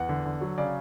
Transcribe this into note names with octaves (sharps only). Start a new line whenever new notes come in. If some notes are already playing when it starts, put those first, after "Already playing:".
Already playing: E2 F#5
D3
D3
F#3
C#3 D5